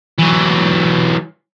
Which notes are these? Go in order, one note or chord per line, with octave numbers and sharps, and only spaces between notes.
E3 F#3